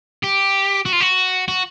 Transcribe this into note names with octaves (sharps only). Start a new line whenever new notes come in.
G4
F#4
F4
F#4
F#4